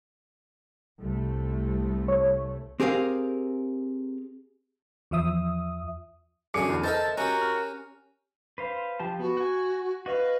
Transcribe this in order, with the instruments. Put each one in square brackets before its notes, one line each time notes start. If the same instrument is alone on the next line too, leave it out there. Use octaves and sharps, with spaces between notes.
[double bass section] C2 A3
[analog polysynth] C#5
[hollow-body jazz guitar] C4 G4 G#4 A#4 F5
[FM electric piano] E2 F3 E5 D#6
[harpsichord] F#2 D3 C#4 [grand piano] G#4 D6 C#7
[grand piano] E2
[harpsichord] A4 A#4 C5 [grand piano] D#5 [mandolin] E5 [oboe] A5
[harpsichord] C#4 G4 [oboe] F#4 [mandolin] A#4
[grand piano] F6
[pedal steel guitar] B4 C5 F5
F3 G4 A5
[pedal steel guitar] B3 [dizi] F#4
[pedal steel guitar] F#5 G#5
[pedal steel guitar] F#4 D#5 F5 [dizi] B4